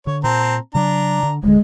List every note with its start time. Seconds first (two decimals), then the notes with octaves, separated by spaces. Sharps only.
0.07 D3 C#5
0.24 A#2 C4 A5 A#5
0.75 C#3 F#3 D4 A#5
1.23 D3
1.43 D1 D3 G#3